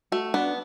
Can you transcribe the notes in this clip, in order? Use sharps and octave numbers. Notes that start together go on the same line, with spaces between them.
A3 F#4
B3 D4